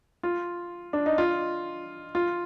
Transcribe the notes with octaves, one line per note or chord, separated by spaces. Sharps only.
F4
D4
D#4
F4
F4